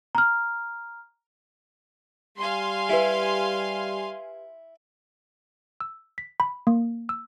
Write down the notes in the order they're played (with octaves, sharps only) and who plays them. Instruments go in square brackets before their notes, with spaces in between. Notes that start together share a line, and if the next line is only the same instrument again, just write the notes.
[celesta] A#5 F6
[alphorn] G3 [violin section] F5 G#5 C6
[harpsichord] E4 [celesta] G4 B4
[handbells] E6
B6
B5
A#3
E6